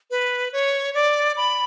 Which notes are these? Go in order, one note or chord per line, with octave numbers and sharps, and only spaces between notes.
B4
C#5
D5
B5